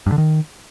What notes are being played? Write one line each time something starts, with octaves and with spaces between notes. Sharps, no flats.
G2
D3
D#3